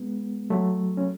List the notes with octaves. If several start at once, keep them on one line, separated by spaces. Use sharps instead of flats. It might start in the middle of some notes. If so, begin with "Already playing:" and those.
Already playing: G#3 B3
F#3 A3
C#4